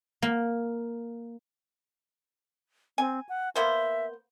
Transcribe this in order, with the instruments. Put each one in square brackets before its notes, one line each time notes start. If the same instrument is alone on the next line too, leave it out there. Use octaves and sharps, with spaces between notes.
[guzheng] A#3
[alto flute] C4 [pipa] G#5
[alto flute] F#5
[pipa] A#3 B3 C5 [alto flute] E5